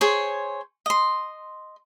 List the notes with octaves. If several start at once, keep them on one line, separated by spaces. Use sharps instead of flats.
G#4 C5 C#5 C6
D#5 C6